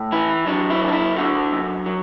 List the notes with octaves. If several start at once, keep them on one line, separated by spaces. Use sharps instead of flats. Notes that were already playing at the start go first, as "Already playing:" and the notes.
Already playing: A2
E3 E4
F#3 D4
E4
F#2
D4
E4
D3 F#4
F#2
F#3